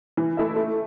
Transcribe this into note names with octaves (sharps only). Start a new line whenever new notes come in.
E3
A3 E4 A4 E5
A3